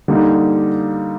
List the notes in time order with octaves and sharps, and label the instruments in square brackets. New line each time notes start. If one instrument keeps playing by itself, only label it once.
[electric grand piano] D3 G3 A#3 D#4